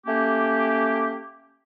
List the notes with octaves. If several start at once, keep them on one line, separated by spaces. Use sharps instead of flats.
A3 A#3 C#4 G4